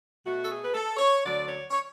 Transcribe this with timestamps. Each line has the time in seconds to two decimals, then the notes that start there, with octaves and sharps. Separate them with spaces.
0.24 B2 A3 F#4
0.43 A4
0.49 G#4
0.64 B4
0.73 A4
0.97 C#5
1.22 D2 D3 F#3 D5
1.46 C#5
1.71 C#5